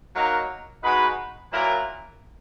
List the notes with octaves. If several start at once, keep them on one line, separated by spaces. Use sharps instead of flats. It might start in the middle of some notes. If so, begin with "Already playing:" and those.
F#3 A#3 D#4 A#4
G#3 D#4 F#4 B4
A#2 F#3 A#3 E4 A#4